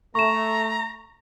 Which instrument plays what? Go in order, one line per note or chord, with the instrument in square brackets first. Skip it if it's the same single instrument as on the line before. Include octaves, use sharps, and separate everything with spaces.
[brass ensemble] A3 [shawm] A#5 [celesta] C#6 E7